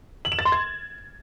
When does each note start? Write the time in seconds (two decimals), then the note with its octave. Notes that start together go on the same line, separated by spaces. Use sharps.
0.25 F#7
0.32 E7
0.39 A6
0.45 C6
0.52 G#6